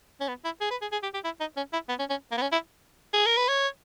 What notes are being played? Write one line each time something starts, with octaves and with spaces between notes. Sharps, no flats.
C#4
B3
E4
G#4
B4
G#4
G#4
G4
G4
E4
D#4
C#4
E4
B3
C#4
C#4
A#3
B3
C#4
E4
G#4
A#4
B4
C#5